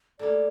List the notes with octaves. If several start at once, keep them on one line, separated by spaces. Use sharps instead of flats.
A2 G3 A#3 D5